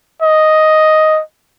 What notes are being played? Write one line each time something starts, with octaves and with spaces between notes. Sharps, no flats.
D#5